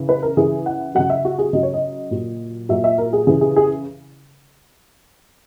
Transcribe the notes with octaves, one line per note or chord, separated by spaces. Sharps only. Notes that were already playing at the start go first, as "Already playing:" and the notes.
Already playing: C#3 E3
B4
A#4
C#3 E3 G#4
F#5
C#3 F#3 F#5
E5
F#4
G#4
C#3 F#3 D#5
C#5
D#5
A#2 F#3
A#2 F#3 E5
E5
A#4
G#4
C#3 E3 G#4
G#4
G#4